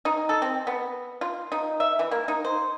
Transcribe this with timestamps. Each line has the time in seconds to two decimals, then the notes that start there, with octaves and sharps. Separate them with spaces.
0.05 D#4
0.29 A4
0.42 C4
0.67 B3
1.21 F4
1.52 D#4
1.80 E5
1.99 E3
2.11 A#3
2.28 D#4
2.45 C5